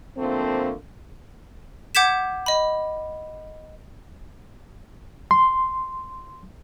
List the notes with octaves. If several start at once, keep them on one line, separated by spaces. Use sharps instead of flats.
D3 F3 A3 A#3 C4
F#5 D6 G6 G#6 B6 E7
D#5 B5
C6